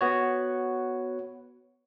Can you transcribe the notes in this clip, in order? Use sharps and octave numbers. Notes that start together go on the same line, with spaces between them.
B3 F#4 C#5